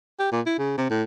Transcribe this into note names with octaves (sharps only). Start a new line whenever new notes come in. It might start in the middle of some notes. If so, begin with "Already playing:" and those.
G4
A#2
E4
C#3
C3
A2